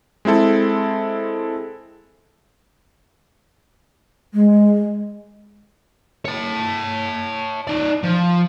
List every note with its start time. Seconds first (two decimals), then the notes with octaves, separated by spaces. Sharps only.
0.25 G#3 C4 E4 A4
4.34 G#3
6.25 C#5 A5
7.68 D#4 D5
8.04 F3